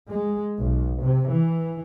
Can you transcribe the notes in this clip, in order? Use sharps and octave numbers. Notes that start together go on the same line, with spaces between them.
G#3
B1
C3
E3